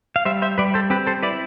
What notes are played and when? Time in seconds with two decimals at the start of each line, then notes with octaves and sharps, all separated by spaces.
0.16 F5
0.25 G3 C5 E5
0.42 C5 E5
0.58 G3 B4 D5
0.74 A4 C5
0.90 C4 G4 B4
1.07 A4 C5
1.23 E4 B4 D5